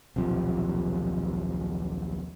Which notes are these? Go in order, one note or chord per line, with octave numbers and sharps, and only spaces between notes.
D#1 B1 C3 F3